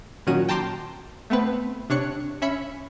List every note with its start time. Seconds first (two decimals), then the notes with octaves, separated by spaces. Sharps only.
0.27 A#2 D#3 F#3 C#4 F#4 D#7
0.49 G5 A5 A#5 C6 D6 G6
1.30 A3 B3 C4 B4
1.90 C3 D4 C#5 F#6 C#7
2.42 C#4 E5 B5 C#7